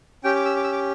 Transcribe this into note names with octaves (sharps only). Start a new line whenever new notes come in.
C#4 G4 G5
D6
E6
D6
E6
D6